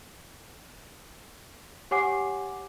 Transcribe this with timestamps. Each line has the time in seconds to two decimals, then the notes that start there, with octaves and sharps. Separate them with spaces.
1.91 G4 C#5 F#5 G#5 D6 C7